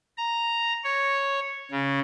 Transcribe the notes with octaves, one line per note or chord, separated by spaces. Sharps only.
A#5
C#5
C#3